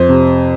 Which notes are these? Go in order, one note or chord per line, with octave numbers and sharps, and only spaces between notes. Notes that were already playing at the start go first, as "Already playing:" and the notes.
Already playing: F2 C5
C3